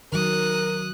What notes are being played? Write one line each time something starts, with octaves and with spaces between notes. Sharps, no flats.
D#3 F#3 A#4 D#6 F#6